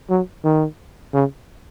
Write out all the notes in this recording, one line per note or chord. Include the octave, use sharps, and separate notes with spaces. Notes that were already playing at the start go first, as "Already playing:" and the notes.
F#3
D#3
C#3